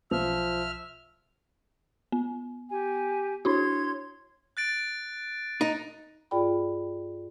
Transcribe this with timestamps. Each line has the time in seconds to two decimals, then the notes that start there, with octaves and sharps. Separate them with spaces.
0.11 B1 F3 E5 F6
2.12 B3
2.69 G4 G#5
3.45 D4 E4 F#4 C#5 C6 G#6
4.57 F#6 A6 D7
5.61 D#4
6.31 G2 F4 G#4 D5 G5 B5